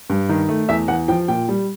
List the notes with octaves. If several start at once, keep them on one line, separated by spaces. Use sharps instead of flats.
G2
D#3
A3
E2 E5
E2 F#5
F3 G5
A#2 G5
G3